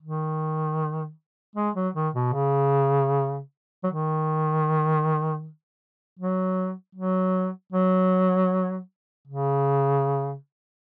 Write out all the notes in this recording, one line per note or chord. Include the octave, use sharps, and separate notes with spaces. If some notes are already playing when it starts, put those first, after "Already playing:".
D#3
G#3
F#3
D#3
B2
C#3
F#3
D#3
F#3
F#3
F#3
C#3